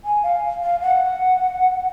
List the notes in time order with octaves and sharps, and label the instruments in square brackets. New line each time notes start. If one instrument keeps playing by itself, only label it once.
[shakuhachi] G#5
F5
F5
F#5